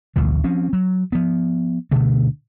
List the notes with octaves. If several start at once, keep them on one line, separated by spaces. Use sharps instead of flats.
A1 D2 B2 F3
F3 C4 C#4
F#3
F3 B3
D2 B2 D3 A3